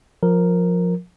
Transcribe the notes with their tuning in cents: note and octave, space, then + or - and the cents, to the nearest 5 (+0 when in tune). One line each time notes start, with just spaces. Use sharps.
F3 +20 A#4 +0